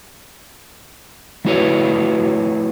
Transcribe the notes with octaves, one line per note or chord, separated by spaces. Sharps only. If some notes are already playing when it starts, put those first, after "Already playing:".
F3 A3 E4 F#4 B4 C#5